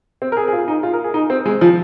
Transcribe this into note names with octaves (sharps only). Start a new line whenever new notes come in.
C4
A#4
G#4
G#4
F4
D#4
F4
A#4
G#4
D#4
C4
G#3
F3